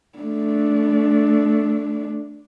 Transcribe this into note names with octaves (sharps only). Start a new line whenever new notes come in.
A3 D4